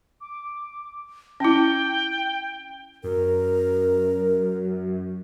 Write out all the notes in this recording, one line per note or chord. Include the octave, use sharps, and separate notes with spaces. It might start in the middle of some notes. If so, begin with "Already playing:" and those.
D6
C#4 E4 G5
F#2 A#4